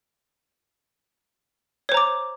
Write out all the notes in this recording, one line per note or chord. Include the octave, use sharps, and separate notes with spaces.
C5 C#5 A#5 D6